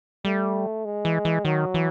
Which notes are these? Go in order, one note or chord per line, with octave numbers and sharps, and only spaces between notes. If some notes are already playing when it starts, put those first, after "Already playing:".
G3 A3
G#3
E3
E3
D#3 F#3
E3